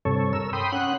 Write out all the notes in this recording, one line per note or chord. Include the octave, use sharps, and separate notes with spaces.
G2 C3 A4 C#5
A#4 E6
G5 B5 C6 D#6
C#4 F#5 F#6